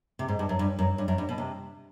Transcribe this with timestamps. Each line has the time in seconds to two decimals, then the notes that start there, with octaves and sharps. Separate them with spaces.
0.19 C3
0.28 G#2
0.39 G2
0.49 F#2
0.59 G2
0.79 F#2
0.98 G2
1.08 F#2
1.18 G2
1.29 B2
1.38 C3